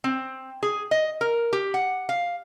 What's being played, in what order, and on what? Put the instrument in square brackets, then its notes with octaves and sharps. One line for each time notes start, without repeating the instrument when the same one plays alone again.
[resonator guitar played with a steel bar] C4
G#4
D#5
A#4
G4
F#5
F5